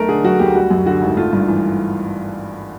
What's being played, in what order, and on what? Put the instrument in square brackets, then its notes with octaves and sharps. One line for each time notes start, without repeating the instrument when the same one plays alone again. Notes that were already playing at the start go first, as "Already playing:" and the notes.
Already playing: [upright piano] B1 A3 A#4
D3 G#4
F#3 F#4
D2 G4
G3 F#4
F#2
D3 F#4
G#1
A3 F4
G2
E3